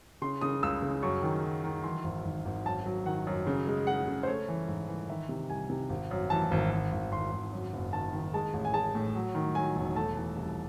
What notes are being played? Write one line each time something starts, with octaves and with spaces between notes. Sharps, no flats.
C#3 C6
C#3 D#6
C#2 E6
C#3
F#2 C#6
D#3
F#3
D#3
E3 C6
G#1
G#1
G#1
F#2 A5
F#3
D#3 F#5
F#2
C#3
G#3
G#3 F#5
C#3
C5
A3 C#5
E3
G#2
E3
D#3 E5
C3
C2 G#5
C3
G#1
F#2
E3 A5
G#1
G#1
G#1
G#1 C6
G#1
F#2
F#1
D#3 A5
D#3
G#3 A5
A1
G#5
G#3 A5
A2
F#3
D#3
F#3 G#5
E1
A3 A5
E3
C2